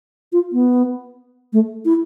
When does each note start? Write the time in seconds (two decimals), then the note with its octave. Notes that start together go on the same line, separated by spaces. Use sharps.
0.32 F4
0.53 B3
1.53 A3
1.85 E4